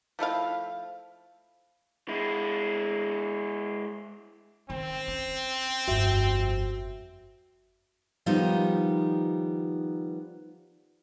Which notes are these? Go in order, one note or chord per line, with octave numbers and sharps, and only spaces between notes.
F3 A3 E4 F5
G#3 E4
D#3 C4
C#4
G1 F2 F#4 E5
D#3 F3 G3 B3 D#4